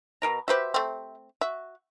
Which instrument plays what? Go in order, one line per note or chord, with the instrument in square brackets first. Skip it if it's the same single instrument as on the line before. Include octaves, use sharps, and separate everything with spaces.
[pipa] B2 A#4 A#5
[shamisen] F#4 B4 [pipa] G4 C5 E5
[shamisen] A3 C4
[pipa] F#4 [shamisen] E5